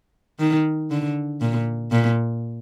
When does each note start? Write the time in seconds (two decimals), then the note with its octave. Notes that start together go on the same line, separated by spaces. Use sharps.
0.39 D#3
0.91 D3
1.41 A#2
1.92 A#2